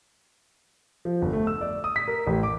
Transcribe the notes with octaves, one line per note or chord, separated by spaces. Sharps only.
F3
G1
A3
E6
D5
D#6
B6
A#4
A1
D6